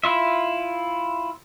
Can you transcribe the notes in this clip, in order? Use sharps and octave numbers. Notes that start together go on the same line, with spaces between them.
E4 F4 E5